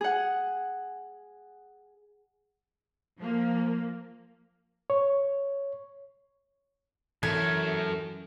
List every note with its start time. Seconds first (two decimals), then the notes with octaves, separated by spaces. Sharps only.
0.01 G#4 F#5
3.19 F3 A#3
4.90 C#5
7.23 F#2 E3 A3 A#4 G#6